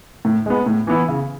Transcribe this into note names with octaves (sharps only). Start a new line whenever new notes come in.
A2
G#3 B3
A2
E3 B3 E4
C#3